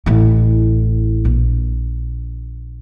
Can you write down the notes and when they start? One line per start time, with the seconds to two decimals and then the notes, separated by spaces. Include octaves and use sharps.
0.06 A1 E4
1.25 A#1